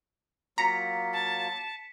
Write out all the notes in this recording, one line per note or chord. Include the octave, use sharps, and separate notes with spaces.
F#3 A#3 F4 A#5 B6 C#7
A5